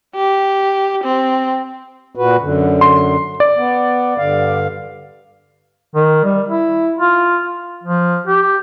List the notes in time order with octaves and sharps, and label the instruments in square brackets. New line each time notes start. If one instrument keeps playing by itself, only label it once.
[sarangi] G4
C4
[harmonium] A#2 F#4 B4
F#2 D3
[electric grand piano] C6
D5
[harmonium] B3
G2 D3 F5
[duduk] D#3
G3
E4
F4
F3
G4